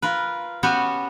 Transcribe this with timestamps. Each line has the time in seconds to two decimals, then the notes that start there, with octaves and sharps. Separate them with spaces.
0.02 F4 A#4 B4
0.63 B3 C#4 F#4 G4 G#5